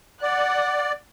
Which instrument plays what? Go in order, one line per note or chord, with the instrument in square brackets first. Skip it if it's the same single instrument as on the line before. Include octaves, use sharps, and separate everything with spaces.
[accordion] D5 [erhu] F#5